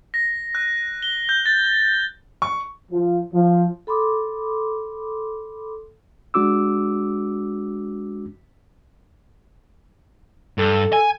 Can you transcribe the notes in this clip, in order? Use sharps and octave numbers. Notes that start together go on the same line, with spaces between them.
A#6
F#6
G7
G6
A6
C#6
F3
F3
A4 B5 C6 D6 D#6
G#3 D4 F#4 D6 E6
G2 A4
G#5